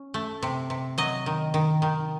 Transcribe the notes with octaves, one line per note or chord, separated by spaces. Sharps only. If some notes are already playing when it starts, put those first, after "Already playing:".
Already playing: C#4
A3
C3
C3
F#3 D#5
D#3
D#3
D#3